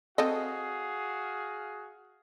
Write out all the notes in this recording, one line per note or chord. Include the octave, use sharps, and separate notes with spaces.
C4 F#4 G#4 A4 D#5 F5